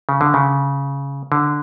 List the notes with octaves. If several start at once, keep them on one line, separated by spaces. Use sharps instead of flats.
C#3
D3
C#3
D3